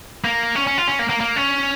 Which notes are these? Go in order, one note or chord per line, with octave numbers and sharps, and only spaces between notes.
A#3
C#4
C#4
F4
C#4
A#3
A#3
A#3
C#4